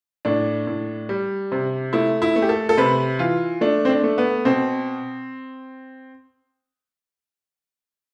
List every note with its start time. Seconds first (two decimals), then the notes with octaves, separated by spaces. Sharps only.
0.25 A2 D4
0.67 A2
1.09 G3
1.52 C3
1.93 A3 E4
2.22 E4
2.36 A3
2.42 G4
2.49 A4
2.69 A4
2.77 C3 B4
3.19 E3 F4
3.61 A3 D4
3.85 C4
3.89 D4
4.04 A3
4.18 B3
4.45 B2 C4